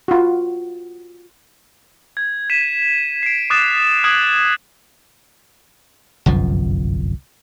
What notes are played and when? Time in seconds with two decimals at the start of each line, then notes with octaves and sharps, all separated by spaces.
0.08 F4 F#4
2.17 G#6
2.50 G#6 B6 D#7 E7
3.23 C7 D7
3.50 D6 D#6 F#6 A6 E7
4.04 D#6 F#6 G#6 D7 F#7
6.26 G1 C2 F#2 F3